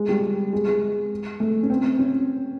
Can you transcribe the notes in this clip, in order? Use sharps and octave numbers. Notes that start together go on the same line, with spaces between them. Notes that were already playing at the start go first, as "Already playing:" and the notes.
Already playing: G#3
G3
G#3
G#3
A3
C#4
C4
C#4